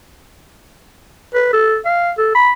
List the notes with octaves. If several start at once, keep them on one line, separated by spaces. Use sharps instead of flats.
B4
A4
F5
A4
B5